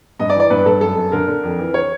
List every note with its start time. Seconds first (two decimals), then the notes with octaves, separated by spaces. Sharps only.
0.19 G2 D#5
0.30 D5
0.34 E3
0.40 D5
0.50 G2 B4
0.66 G2 A4
0.81 F#2 A4
0.97 F#2
1.12 D3 A#4
1.27 D3
1.43 F2
1.58 E3
1.74 C#5